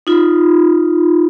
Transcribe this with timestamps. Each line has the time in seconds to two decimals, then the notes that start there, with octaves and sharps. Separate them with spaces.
0.07 D#4 F4